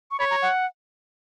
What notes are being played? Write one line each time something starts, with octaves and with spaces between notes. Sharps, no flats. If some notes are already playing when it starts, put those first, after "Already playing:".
C#6
C#5 B5
A#5
F#5